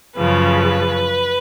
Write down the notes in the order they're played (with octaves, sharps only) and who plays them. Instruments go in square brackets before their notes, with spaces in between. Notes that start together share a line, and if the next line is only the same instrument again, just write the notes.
[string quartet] F#2 C#3 F3 B4